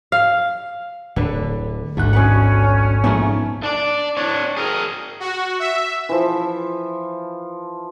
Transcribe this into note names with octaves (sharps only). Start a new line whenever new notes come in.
F5
D1 D3 B4
A1 D2 G#2 A3 F#6
B2 C#4 B4 F#5
A#1 G#2 A3 B3
D4 D5
D4 C#5
G#4 A#4
F#4
E5
E3 F3